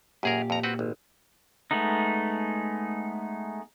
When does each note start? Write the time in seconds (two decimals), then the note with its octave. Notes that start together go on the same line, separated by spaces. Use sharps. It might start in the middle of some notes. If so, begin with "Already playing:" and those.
0.23 F#2 A#2 G4 G#4 A#4
0.50 F2 A#5
0.63 C4 F#4 B4
0.79 G#1
1.71 G#3 A3 B3 D#4